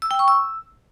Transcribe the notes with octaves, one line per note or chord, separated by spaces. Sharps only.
E6
G5
C#6
E6